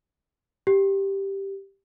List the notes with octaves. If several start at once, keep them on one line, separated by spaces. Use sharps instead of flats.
G4